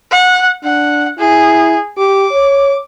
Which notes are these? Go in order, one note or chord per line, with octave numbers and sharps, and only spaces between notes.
F#5
D4 F#5
E4 G#4
G4 D6
C#5